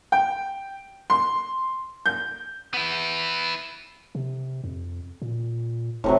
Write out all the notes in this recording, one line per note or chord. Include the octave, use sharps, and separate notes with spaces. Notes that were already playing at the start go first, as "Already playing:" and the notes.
G5
C6
G6
B3 E4
C3
F2
A#2
F1 A2 C3 F#3